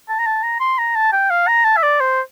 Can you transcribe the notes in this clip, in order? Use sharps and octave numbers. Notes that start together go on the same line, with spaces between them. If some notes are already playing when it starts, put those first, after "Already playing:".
A5
A#5
A5
A#5
C6
A#5
A5
G5
F5
A#5
A5
E5
D5
C5